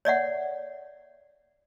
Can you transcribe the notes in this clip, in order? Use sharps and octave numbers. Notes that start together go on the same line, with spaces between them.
C#5 D5 E5 F#5